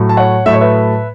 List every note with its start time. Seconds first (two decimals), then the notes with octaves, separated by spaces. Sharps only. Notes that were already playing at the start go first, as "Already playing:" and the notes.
Already playing: A2 F#3 A3
0.09 A5
0.17 C#5 F#5
0.46 A2 F#3 A3 E5
0.53 C#5
0.61 B4 E5